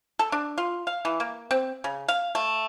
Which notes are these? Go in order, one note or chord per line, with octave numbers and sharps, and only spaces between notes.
A4
D4
F4
F5
E3
A#3
C4
C#3
F5
A3